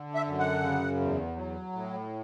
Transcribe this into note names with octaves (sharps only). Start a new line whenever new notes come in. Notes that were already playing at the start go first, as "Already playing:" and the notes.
Already playing: D3
E5
F#2
F#5
C#3
E2
F#3
A2